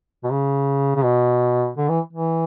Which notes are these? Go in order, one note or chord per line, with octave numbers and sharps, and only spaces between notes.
B2
C#3
C#3
B2
D3
E3
E3